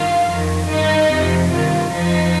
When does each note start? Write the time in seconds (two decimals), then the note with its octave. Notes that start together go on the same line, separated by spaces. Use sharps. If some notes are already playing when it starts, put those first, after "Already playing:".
Already playing: G2 D#3 F4 F5
0.27 F2 D#3
0.68 G2 D#3 D#4 D#5
1.09 F2 C3 F3
1.50 G2 D#3 F4
1.91 F2 F3 D#4